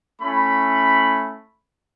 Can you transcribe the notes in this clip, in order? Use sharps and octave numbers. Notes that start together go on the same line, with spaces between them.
A3 C#4 E4 B5